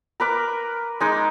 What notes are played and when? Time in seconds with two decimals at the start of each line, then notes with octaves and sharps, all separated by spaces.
0.20 A#4 B4 D6
1.00 G#3 D#4 D6